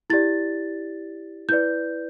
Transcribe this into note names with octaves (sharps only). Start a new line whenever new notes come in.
E4 G4 D5 A6
E4 B4 D5 G6